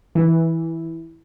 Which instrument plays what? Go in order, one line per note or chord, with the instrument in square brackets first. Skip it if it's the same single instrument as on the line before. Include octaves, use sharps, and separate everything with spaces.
[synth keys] E3